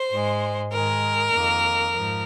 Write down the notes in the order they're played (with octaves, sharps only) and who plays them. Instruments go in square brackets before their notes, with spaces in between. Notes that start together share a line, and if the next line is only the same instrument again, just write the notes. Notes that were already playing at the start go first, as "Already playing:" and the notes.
Already playing: [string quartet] C5
G#2 G#3
G#2 D#3 G#3 A#4
F2 D#3 A#3
G#2 F3